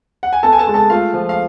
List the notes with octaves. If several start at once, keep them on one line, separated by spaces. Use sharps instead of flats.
F#5
G#5
B3 A4 A5
G#5
A4 A5
G#3
A4 A5
A3 F4 F5
F3
F5